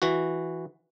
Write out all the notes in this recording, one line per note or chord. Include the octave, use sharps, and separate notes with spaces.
E3 F#4